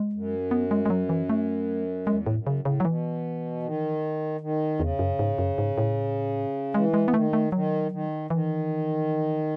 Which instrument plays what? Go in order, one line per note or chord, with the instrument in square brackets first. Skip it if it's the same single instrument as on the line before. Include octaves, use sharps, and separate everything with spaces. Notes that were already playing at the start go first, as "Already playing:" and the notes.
Already playing: [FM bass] G#3
[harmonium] F#2
[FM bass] B3
G#3
G#3
F#3
E3
A3
[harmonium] E2 [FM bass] G#3
[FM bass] A2
[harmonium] F#2
[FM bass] C#3
[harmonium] A2
[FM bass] C#3
F#3
[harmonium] B2 [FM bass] E3
[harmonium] D#3
D#3
[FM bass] E2 [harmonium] C#3
[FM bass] F#2
G#2
F#2
G#2
A2
[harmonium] E3 [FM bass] G#3
[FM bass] G#3
B3
[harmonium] D#3 [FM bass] A3
[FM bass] A3
[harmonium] D#3 [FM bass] F#3
[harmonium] D#3
[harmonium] D#3 [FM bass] E3